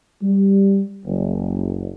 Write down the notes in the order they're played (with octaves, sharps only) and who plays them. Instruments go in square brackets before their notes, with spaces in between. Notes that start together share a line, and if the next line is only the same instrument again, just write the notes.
[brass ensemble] G3
F#1